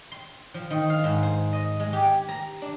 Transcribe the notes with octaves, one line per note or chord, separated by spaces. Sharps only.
C6
F3
D#3
F5
G#2
C5
D#5
G#3
G4
A#5
D4